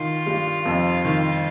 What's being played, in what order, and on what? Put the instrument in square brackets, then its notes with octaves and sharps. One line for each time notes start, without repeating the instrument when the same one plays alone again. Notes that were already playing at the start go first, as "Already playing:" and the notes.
Already playing: [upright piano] D#3 [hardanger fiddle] F4
[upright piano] G2 G3
F2 F3
D#3